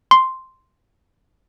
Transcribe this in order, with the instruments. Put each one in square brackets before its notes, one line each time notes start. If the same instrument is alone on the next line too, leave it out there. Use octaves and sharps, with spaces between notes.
[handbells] C6